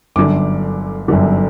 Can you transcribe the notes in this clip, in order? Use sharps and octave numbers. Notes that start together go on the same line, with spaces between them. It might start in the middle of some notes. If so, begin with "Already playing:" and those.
G1 F#2 D3 D6
G1 F#2 D3